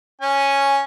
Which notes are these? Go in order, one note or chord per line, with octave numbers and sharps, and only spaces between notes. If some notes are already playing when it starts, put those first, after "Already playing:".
C#4 G#5